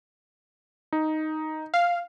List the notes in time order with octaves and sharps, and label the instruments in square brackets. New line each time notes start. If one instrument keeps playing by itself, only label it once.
[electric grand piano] D#4
[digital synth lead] F5